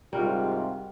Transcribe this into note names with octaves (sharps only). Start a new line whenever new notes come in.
G#2 C3 G3 F4 F#4 A#4